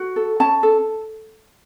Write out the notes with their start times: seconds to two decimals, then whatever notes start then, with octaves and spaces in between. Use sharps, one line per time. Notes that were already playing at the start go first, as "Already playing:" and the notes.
Already playing: F#4
0.16 A4
0.40 C#4 A5
0.63 A4